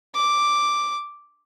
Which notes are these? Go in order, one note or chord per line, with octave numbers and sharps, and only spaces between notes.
D6